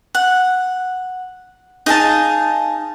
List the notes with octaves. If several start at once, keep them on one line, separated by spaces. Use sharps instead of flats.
F#5
D#4 G#4 F5 A5